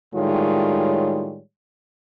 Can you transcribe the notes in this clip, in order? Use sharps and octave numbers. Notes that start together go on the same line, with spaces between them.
A2 D#3 G3 G#3 F4 C#5